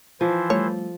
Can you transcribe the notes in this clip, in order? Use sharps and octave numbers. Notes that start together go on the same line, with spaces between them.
E3 F3 E4 C5
G3 A3 C#5